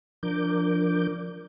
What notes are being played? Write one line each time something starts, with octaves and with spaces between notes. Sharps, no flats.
F3 D4 A#4 D6 G6